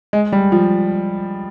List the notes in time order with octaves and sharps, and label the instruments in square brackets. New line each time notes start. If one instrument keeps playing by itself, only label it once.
[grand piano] G#3
G3
F3